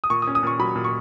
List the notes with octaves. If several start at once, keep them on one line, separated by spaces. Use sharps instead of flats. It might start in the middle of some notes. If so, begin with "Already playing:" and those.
D#6
A#2 C#6
D#6
C#4
D#6
A#2 C#6
F#3 B5
A#2
C#6